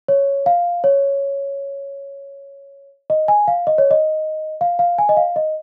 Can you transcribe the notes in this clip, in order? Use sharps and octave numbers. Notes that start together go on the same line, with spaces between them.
C#5
F5
C#5
D#5
G#5
F5
D#5
C#5
D#5
F5
F5
G#5
D#5
F5
D#5